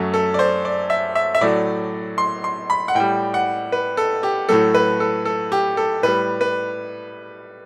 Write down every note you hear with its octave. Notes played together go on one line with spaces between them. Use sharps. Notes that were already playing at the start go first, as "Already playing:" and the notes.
Already playing: F#2 F#3 A3
A4
D5
C5
D5
E5
E5
E5
A2 F#3 A3 D5
C6
C6
B5
F#5
A2 G3 G5
F#5
B4
A4
G4
A2 F#3 A3 A4
B4
A4
A4
G4
A4
A2 G3 B4
B4